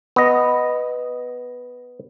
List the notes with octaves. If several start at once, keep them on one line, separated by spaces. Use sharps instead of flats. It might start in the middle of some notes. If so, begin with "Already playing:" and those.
B3 D#5